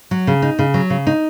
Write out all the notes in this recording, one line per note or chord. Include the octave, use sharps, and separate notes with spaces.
F#3
C#3
D#4
C#3
F#3
C#3
D#4